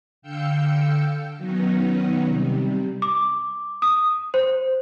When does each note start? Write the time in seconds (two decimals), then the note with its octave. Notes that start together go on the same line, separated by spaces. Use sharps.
0.22 D3 F5 G5 E6 G6 C#7
1.37 D#3 F#3 B3 C#4 D#4
2.27 C3 G3
3.02 D6
3.82 D#6
4.34 C5